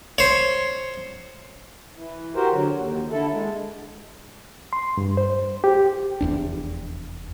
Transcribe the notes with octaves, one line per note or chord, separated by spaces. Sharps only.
C5 C#5
E3
F#4 G4 A#4 C5
D3 F#3
D#2
D3 E4 A4
G#3
C6
G2
C5
G4
F1 E2 D4